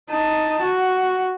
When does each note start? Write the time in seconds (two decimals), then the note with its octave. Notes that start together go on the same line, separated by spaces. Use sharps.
0.10 D#4 A5
0.62 F#4